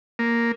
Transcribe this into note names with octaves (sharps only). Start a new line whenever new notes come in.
A#3